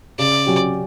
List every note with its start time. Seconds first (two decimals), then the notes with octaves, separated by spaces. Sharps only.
0.19 C#3 D5
0.46 F#3 C#4 G4